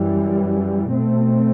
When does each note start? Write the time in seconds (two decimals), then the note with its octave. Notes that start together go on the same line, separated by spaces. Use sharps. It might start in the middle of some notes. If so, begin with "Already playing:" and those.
Already playing: F#2 E3 G3
0.93 B2 A3 C4